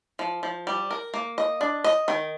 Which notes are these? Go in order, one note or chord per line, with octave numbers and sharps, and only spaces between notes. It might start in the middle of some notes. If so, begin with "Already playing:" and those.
F3
F3
G3
A#4
A#3
D#5
D4
D#5
D#3